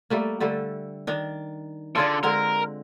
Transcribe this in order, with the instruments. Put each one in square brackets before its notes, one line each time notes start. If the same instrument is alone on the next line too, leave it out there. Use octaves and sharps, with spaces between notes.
[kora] G3 A3 A#3
D3 G3 A3
D#3 D4
[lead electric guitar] D3 [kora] F4 G#4 D5
[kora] D3 G#3 C4 [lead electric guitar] A#4